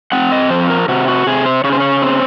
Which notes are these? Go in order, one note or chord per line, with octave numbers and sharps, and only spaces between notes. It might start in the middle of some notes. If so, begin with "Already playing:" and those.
C4 F#5
D#5
F3 C5
A#4
C3 F#4
F#4
C3 G#4
C5
C#3 C#5
C5
C#5
C4